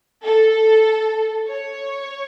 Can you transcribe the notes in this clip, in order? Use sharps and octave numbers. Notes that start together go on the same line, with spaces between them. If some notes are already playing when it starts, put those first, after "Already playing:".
A4
C#5